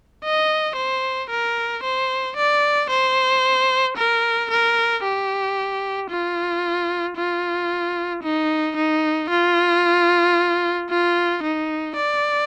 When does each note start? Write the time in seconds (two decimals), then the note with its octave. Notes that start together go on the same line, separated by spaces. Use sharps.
0.24 D#5
0.77 C5
1.30 A#4
1.83 C5
2.37 D5
2.90 C5
3.97 A#4
4.51 A#4
5.04 G4
6.10 F4
7.17 F4
8.23 D#4
8.76 D#4
9.30 F4
10.90 F4
11.43 D#4
11.96 D5